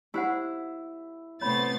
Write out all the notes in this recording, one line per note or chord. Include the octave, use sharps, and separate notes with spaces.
E4 G4 C5 F#5
C3 A3 B3 C4 C#5 B5 A6